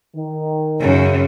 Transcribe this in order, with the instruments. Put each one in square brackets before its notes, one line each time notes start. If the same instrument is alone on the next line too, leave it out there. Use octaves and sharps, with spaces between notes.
[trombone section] D#3
[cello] F#2 C#3